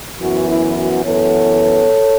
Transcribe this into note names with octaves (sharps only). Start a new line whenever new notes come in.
F#2 E3 B3 F#4
E4
F#4
F#2 E3 B3 A4 C#5